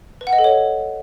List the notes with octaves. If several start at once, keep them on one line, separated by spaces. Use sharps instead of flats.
B4
F#5
D#5
A4
C#5